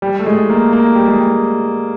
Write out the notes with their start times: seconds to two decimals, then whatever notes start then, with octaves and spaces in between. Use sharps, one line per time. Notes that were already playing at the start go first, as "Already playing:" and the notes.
0.02 G3
0.19 A3
0.26 G#3
0.50 A#3
0.73 A#3
0.95 G3
1.08 G#3
1.19 G3